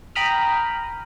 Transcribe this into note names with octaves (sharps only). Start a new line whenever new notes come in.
G5 A#5 B5 D#6 F6